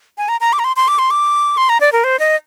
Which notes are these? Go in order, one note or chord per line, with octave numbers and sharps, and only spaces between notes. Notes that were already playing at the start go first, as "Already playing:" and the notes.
G#5
A#5
A#5
D6
A#5
C6
C6
D6
C6
D6
C6
A#5
D5
A#4
C5
D#5